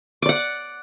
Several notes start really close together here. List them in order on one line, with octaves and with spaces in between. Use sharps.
D6 D5 F#5